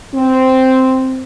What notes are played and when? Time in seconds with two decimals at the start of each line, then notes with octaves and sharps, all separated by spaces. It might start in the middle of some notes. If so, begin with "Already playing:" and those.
0.14 C4